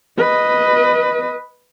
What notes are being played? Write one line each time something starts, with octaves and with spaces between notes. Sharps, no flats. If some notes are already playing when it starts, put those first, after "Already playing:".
B4 D#5